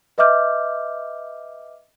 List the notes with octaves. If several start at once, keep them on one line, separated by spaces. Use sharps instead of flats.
B4 D#5 E5 D6 F6 G6